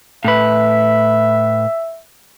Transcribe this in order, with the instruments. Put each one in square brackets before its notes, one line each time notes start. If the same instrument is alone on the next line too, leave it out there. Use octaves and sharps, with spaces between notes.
[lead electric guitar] A2 B4 [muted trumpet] E5